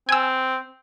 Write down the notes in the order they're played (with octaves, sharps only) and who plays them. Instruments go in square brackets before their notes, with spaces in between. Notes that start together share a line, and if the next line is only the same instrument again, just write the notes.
[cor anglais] C4 [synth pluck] G#5 E6